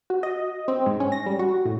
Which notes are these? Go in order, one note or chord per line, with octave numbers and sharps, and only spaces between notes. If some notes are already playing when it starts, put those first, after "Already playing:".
F#4
D#5
C4
G#2
C#4
A#6
G3
F#4
A2